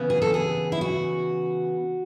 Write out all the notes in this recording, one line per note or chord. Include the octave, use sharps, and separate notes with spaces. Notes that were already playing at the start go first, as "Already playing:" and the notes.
Already playing: C#3 E3 B3
G#4
A4
G#4
E4
F#4